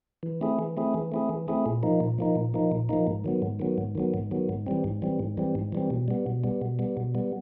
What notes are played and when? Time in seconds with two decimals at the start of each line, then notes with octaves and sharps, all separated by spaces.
0.23 E3
0.41 A3 C4 E4 G#4
0.59 E3
0.77 A3 C4 E4 G#4
0.94 E3
1.12 A3 C4 E4 G#4
1.29 E3
1.48 A3 C4 E4 G#4
1.66 A#2
1.83 F3 A#3 D#4
2.00 A#2
2.18 F3 A#3 D#4
2.35 A#2
2.54 F3 A#3 D#4
2.72 A#2
2.89 F3 A#3 D#4
3.07 G#2
3.24 D#3 F#3 B3
3.42 G#2
3.59 D#3 F#3 B3
3.78 G#2
3.95 D#3 F#3 B3
4.14 G#2
4.31 D#3 F#3 B3
4.49 G#2
4.66 E3 G3 C4
4.84 G#2
5.02 E3 G3 C4
5.19 G#2
5.37 E3 G3 C4
5.55 G#2
5.72 E3 G3 C4
5.90 B2
6.08 G3 B3
6.26 B2
6.44 G3 B3
6.62 B2
6.79 G3 B3
6.97 B2
7.15 G3 B3